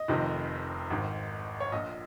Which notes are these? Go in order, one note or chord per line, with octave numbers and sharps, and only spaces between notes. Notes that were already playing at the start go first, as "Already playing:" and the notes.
Already playing: D#5
F1 F2 C3 D#3
G#1 G#2 D#3
C#5
A#1 A#2 D#5